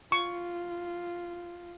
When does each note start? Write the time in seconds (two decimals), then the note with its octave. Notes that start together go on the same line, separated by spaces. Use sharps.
0.12 F4 C#6